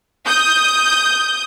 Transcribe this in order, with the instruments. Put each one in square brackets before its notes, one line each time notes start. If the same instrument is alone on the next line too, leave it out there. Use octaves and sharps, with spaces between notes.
[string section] D#6 G6